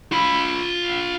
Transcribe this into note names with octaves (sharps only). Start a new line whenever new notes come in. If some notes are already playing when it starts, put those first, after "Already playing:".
F4 B5